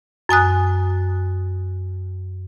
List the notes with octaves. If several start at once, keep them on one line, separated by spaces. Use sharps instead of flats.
F#2 G#5 D#6 F#6